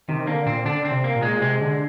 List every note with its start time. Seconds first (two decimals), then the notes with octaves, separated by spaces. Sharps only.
0.08 C3 D#3
0.27 D3 A#3
0.46 A#2 C4
0.65 D3 D4
0.85 C4
0.91 C3
1.04 A#3
1.16 A#2
1.22 G#3
1.41 C3 G#3
1.61 D3